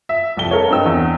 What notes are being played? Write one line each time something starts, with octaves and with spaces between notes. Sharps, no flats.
E5
C2 F2 G7
A4 A#4 C#5
G2 C4 D#5 G5 E6
E2